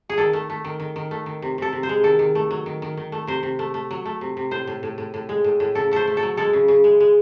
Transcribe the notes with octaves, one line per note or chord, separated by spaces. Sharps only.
G#4
D#3 A4
A3
A3
D#3
D#3
D#3
A3
D#3
C3
C3 A4
C3
C5
G#3
D#3 A4
D#3
A3
F#3
D#3
D#3
D#3
A3
C3 C5
C3
A3
A3
F#3
A3
C3
C3
A2 C5
A2
A2
A2
A2
G#3
A2
A2
C#3 A4
A3 A4 C5
A3
A4
F#3
G#3 A4
C#3
C#3
G#3
G#3